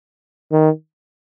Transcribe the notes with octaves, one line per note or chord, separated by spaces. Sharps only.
D#3